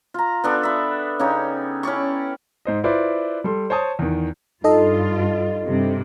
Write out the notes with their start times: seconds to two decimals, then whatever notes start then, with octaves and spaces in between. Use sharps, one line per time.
0.14 F4 A#5
0.44 B3 D4 A4
0.63 E5 B5
1.19 C#3 D#4 G4 C#5
1.83 C#4 E4 D5 C#6
2.65 G#2 C5 D#5
2.84 E4 F4 B4 C5 D5
3.44 G3 A4 C6
3.70 C5 C#5 A5 D#6
3.99 E2 D#3
4.64 G2 D#4 F4 A4 D#5
5.66 G2 C3